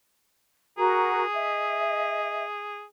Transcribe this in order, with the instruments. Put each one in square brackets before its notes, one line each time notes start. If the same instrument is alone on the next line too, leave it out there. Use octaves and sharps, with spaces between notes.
[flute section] F#4 A#4 A#5 [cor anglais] G#4
[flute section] D#5 E5